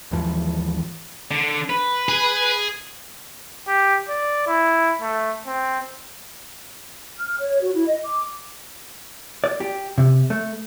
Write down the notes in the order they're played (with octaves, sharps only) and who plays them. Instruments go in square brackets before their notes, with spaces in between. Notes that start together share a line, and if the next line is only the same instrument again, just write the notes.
[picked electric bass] D#2 G#2 E3 F3
[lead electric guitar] D3
B4
[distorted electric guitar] G#4
[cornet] G4
D5
E4
A3
C4
[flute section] F6
C#5
F#4
E4
D#5
D6
[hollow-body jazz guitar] D5
G4
C3
A3